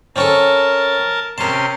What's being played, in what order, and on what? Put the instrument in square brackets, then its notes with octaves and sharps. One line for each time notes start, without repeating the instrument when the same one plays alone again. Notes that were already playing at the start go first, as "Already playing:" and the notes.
[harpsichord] C4 C#4 A4 [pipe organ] A#4 A5
[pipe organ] C3 C#4 C6 [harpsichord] A#4 A5